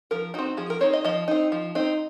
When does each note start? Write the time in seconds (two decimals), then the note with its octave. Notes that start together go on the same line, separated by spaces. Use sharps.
0.11 F3 A#4
0.34 C4 D#4 F#4
0.57 F3 G#4
0.70 A#4
0.81 C4 D#4 C#5
0.93 D#5
1.04 F3 D#5
1.28 C4 D#4
1.52 F3
1.75 C4 D#4